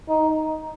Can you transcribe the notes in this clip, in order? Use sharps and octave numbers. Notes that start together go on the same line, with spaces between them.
D#4